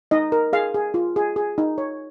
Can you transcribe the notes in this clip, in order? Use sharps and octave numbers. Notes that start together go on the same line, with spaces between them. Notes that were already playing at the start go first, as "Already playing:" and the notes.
D#4 D#5
A#4
G#4 F5
G#4
F4
G#4
G#4
D#4
C#5